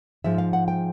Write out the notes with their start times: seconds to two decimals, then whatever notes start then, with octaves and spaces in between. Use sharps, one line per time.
0.24 G#2 F3 G#3 E5
0.38 F5
0.53 F#5
0.68 G5